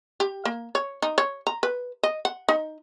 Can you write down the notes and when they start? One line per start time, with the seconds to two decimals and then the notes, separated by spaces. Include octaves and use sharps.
0.20 G4
0.45 A#3
0.75 C#5
1.02 D#4
1.18 C#5
1.47 A#5
1.63 B4
2.03 D#5
2.25 F#5
2.49 D#4